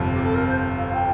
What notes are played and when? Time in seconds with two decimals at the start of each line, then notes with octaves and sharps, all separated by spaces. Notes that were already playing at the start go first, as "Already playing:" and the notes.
Already playing: G1 F2 C3
0.12 G4
0.23 A4
0.34 A#4
0.47 C5
0.76 F5
0.87 F5
0.94 G5